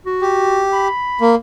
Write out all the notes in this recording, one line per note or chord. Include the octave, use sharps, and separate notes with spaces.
F#4
G4
B5
A#3